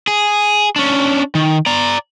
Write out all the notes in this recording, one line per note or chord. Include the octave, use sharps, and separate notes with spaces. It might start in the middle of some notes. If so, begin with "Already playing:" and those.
G#4
C#4 D4
D#3
D5 A#5